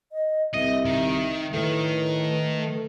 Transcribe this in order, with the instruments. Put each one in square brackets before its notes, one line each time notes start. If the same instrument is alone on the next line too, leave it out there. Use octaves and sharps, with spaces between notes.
[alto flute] D#5
[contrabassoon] C2 [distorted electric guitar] D#5 [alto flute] E5
[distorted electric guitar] D#3
[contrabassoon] A2 [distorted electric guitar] D#3 [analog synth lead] A3 [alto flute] B4